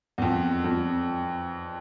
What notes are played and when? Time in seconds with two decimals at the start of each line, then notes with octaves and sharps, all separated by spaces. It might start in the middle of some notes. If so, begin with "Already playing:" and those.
0.18 E2
0.22 F2
0.64 F2